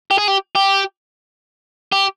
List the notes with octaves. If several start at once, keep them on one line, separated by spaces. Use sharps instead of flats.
G4
G#4
G4
G4
G4